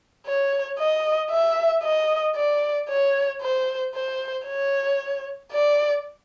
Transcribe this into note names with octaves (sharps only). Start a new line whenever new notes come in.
C#5
D#5
E5
D#5
D5
C#5
C5
C5
C#5
D5